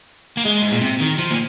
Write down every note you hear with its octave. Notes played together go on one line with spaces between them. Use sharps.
A#3
G#3
G#2
A#2
C3
D#3
F3
A#2